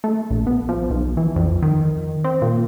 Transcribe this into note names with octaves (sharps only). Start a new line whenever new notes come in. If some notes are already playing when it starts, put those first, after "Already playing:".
A3
A#1
B3
F3
B1
E3
F2
D#3
C4
A#2